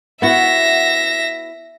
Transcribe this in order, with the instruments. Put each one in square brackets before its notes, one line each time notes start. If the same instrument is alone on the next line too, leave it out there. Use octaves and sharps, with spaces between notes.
[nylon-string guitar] B3 E4 F#4 [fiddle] E5 [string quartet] A#6